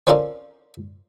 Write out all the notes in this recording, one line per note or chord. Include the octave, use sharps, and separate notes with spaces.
C4 C#4 F4 A4 A#4 D5